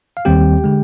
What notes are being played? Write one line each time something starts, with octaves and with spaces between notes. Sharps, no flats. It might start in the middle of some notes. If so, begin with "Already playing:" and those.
F5
D#2 D#3 G3 C4 G4 G5
D3 G#3